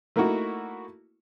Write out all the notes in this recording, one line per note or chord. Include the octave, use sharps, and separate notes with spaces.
A3 A#3 D#4 E4 F#4